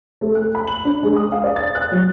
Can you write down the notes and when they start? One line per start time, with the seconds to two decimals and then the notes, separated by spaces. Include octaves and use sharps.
0.21 A3
0.35 F#6
0.55 B5
0.67 F#7
0.85 D4
1.03 G#3
1.16 D#6
1.32 F5
1.44 D5
1.56 A6
1.75 F#6
1.92 F#3